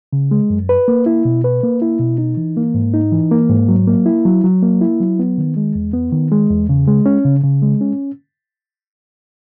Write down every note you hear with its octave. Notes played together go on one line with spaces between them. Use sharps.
C#3
G#3
F#2
B4
A#3
E4
B2
B4
A#3
E4
B2
D#4
E3
A#3
G#2
D#4
E3
A#3
G#2
F#3
A#3
E4
F#3
F#3
A#3
E4
F#3
B3
D#3
G#3
E2
B3
D#3
G#3
E2
C#3
G#3
C#4
C#3
C#3
G#3
C#4